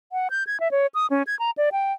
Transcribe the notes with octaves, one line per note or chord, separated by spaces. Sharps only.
F#5
G6
G#6
E5
C#5
D#6
C#4
G#6
A#5
D5
G5